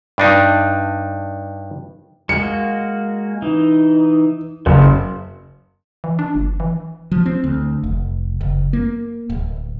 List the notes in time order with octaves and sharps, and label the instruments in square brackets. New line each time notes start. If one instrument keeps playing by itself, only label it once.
[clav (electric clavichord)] G2 D4 D#4
[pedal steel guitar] G#3 A#3 F#4 [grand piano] C#7
[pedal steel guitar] E3 D#4
[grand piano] F#1 [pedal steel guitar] F#3 B3 E5
[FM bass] E3
D4
G1
E3
[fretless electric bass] F3
C4
D2
F1
F#1
A#3
D1